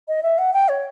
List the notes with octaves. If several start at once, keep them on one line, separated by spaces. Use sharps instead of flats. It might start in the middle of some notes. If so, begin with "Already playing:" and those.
D#5
E5
F#5
G5
C#5